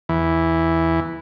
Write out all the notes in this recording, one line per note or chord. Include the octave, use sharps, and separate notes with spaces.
E2 E3